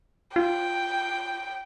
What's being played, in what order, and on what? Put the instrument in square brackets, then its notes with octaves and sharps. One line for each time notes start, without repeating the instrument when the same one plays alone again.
[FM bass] F4 [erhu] G5